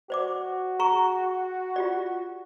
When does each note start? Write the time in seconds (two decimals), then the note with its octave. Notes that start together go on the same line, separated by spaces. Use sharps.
0.10 F#4 C5 D5 D6
0.79 G#4 A#5 C#6
1.76 F4 G4 D5